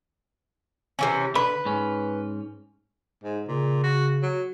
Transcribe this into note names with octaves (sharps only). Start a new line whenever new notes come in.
C3 E3 C#4
D3 B4 B5
G#2 C#4
G#2
A#2 C#3
F#4
F#3